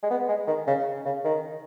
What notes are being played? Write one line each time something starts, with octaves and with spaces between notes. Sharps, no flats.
G#3
B3
G#3
D#3
C#3
C#3
D#3